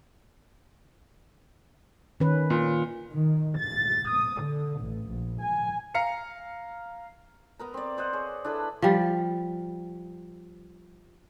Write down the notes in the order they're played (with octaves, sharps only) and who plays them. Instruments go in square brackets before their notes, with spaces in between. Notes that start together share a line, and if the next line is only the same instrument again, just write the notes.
[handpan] D#3 C#4 B4
[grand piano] A#2
[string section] D#3
A6
D#6
D3
A1
A#1
G#5
[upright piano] F5 A#5 C#7
[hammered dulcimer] B3 A#4 A#5
C4 D5
A#4 C5 D#5 F#5
G#4 C#5
D4 E4 A4 B4
[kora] F3 G3